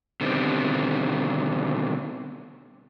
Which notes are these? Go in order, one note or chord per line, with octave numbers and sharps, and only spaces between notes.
B2 D3 D#3 G3 C4